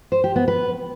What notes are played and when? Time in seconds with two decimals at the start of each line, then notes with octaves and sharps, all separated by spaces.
0.12 C5
0.24 G4
0.36 B3
0.48 B4